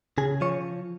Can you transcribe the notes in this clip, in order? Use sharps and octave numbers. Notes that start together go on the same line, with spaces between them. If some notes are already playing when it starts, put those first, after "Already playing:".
C#3 G#4
F3 C#5